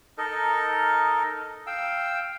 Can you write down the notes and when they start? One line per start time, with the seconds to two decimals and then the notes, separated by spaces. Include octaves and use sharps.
0.18 D#4 A4 A#4 D#5
1.67 F5 G5 E6